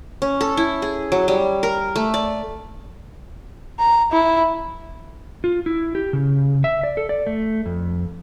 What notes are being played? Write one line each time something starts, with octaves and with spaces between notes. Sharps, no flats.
C#4
A4
E4
G#4
F#3
G3
A#4
A3
D5
A#5
E4
F4
E4
G4
C#3
E5
D5
A4
D5
A3
F2